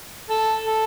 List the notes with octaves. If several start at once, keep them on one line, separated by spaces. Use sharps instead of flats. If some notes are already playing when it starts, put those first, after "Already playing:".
A4
A4